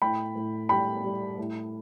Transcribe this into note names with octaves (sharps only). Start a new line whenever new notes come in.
A2 G5 B5
A2
G3 G5 B5
G3
A2